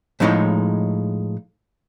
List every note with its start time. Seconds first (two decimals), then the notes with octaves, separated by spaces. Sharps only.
0.20 A2 F3 G#3 D#4 E4 C#5